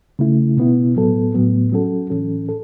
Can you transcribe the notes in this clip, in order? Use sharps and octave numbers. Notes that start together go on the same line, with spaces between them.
C#3 A3 E4
B2 B3 E4
A2 F#3 B3 A4
A2 F#3 B3
F#3 C#4 F#4 A4
A2 E3 C#4 A4
A4